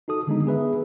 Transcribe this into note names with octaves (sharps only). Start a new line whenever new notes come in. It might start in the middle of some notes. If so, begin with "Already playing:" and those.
D#4 F#4 A4 D#6
D3 D#3 G#3 B3 D4 D#4
B3 G#4 B4 E5